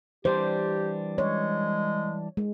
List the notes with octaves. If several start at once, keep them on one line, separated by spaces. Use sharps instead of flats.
E3 G3 D4 G4 C5
G#3 C#5
G#3